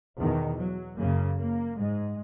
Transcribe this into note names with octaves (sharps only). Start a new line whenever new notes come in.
E2 B2 D#3
F#3
F#2 C#3 A#3
A#3
G#2 G#3